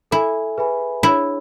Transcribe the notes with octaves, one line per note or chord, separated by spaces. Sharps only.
E4 A4 E5 G#5
G#4 B4 E5 G#5 B5
D4 E4 G#4 C#5